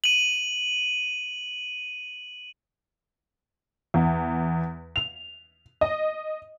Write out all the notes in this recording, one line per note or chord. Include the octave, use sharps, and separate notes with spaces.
D#7 F#7
E2
F7
D#5